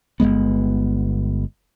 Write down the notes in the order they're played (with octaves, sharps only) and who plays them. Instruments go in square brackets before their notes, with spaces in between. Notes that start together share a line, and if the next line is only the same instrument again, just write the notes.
[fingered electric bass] G1 G#2 G#3 B3